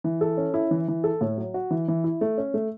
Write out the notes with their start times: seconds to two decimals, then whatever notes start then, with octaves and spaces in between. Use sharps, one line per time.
0.04 E3
0.21 A4
0.37 C#4
0.54 E4
0.71 E3
0.88 E3
1.04 A4
1.21 A2
1.37 F#3
1.54 F#4
1.71 E3
1.88 E3
2.04 E4
2.21 A3
2.38 C#4
2.54 A3